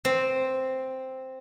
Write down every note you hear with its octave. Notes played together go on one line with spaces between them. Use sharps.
C4